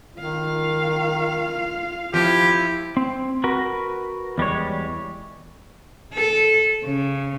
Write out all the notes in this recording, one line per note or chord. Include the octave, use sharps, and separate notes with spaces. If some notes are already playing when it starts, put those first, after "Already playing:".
D#3 F4 F5
F3 E4 G4
C4
F#4 A#4 B4
E2 G3 G#3 C#5
A4
C#3